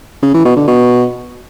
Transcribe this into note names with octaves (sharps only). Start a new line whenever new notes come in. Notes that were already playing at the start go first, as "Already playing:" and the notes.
C#3
E3
B2
D3
B2